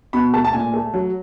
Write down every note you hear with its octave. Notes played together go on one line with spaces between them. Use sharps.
B2 B5
A3 A5
A5
A#2 G#5
A3
F#3